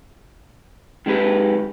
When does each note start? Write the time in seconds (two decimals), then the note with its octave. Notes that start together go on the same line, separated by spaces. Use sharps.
1.06 D#3 G#3 G4 B4